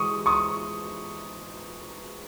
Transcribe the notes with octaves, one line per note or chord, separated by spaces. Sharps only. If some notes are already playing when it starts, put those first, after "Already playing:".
Already playing: E3 G#3 C#6 D#6
C#6 D#6